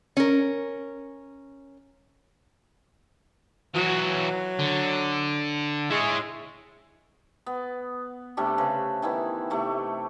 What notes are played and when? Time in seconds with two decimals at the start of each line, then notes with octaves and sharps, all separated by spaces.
0.17 C#4 A#4
3.74 E3 F#3 F#4
4.59 D3
5.90 G#3 E4 C#5
7.46 B3
8.37 C3 G3 A3 D4
8.58 C#3 B4
9.02 D#3 E3 B3 E4
9.50 C3 A3 G4